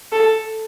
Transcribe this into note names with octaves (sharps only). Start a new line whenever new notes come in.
A4